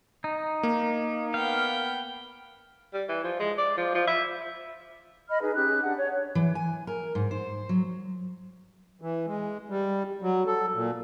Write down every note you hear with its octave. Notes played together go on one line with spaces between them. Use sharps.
D#4
A#3
B3 F5 G5
G3
E3
F3
G#3
D5
F3
F3
E5
D#5 B5 F6
D#4 G#4 B4
C#4 G4 G#4 F#6
D4 F#5
C#5
E3
G#5
A#4
G#2
C5
F#3
E3
G#3
G3
F#3
A4
A#2